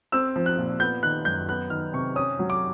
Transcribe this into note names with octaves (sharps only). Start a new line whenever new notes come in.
C4 E6
F3
F#6
A#2
B3 G6
D#3 F#6
F#2 G6
B3 F#6
D#3 F6
C3 C#6
C#4 D#6
F#3
D6